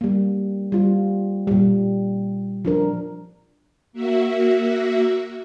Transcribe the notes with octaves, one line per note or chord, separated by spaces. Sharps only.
G3 A#3
G3 F4
A#2 G3
F3 D4 A#4
A#3 F#4 E5